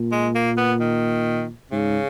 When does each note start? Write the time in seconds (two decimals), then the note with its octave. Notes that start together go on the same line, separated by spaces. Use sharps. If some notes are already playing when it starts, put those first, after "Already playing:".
Already playing: A#2
0.12 G#3
0.35 A#3
0.57 B3
0.80 D#3
1.72 G#2 C#3